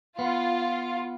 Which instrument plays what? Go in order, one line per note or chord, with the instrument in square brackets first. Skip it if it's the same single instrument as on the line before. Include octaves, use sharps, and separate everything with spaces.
[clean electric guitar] B3 [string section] F4